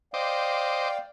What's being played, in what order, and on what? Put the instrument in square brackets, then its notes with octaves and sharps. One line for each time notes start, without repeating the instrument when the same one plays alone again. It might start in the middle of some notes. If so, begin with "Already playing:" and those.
[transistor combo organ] C5 D#5 D6 [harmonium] D5 F5 G5